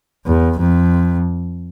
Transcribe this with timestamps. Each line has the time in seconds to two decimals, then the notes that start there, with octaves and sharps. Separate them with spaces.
0.26 E2
0.59 F2